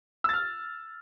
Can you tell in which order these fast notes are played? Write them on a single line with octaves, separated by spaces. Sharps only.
E6 A6 F6